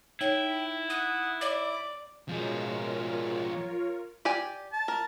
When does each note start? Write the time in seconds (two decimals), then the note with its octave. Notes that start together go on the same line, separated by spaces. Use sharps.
0.21 D#4 E4 C#5 G5
0.90 F#5 D#6
1.41 C#5 D5 D6
2.29 B2 F3 G#3 F4 G#4 A#4 C#5
4.25 G4 D5 G#5
4.72 A5
4.88 A#4